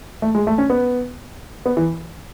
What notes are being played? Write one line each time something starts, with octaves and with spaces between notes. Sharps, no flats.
A3
G#3
A3
C#4
B3
B3
E3